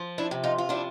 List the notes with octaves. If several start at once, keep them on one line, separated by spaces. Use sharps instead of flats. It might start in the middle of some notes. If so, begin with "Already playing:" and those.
Already playing: F3
D4 E4
C3
D#4 F4
F4
F3 D4 E4